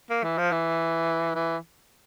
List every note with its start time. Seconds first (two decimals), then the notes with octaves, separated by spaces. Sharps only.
0.10 A#3
0.24 E3
0.38 F3
0.52 E3
1.35 E3